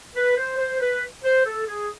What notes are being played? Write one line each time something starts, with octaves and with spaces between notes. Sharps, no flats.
B4
C5
C5
B4
C5
A4
G#4